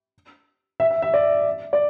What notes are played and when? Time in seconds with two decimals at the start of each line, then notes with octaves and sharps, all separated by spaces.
0.80 E5
0.91 E5
1.02 E5
1.14 D5
1.73 D5